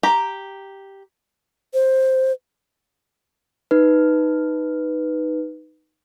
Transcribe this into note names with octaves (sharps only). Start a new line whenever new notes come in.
G4 A#5
C5
D#4 B4